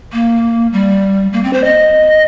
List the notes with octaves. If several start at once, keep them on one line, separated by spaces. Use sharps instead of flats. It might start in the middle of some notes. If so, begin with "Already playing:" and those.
A#3
G3
A#3
C4
C5
D#5